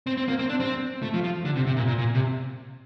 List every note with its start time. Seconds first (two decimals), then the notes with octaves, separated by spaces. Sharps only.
0.07 C4
0.17 C4
0.28 A#3
0.39 C4
0.49 D4
0.60 C4
1.03 A3
1.14 F3
1.24 F3
1.45 D3
1.56 C3
1.66 C3
1.77 A#2
1.87 A#2
1.98 A#2
2.15 C3